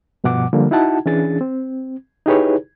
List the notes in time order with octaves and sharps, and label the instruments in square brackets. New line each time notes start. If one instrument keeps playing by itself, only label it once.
[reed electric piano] G2 B2 F3 F#5 D6
D3 F3 G3 A#3
D#4 E4 F#4 F#5 A5
E3 C#4 D4 G#4 A6
C4
D#4 E4 G4 G#4 B4 C#5